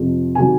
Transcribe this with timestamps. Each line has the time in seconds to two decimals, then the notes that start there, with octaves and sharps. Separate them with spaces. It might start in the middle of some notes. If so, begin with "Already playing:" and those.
Already playing: F2 C3 F3
0.35 C3 D#3 F#3 G#5